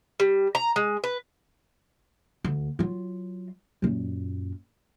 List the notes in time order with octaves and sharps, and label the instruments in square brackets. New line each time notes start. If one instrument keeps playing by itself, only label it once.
[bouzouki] G3
A#5
G#3
B4
[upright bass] D2
F#3 F4
F#2 A#2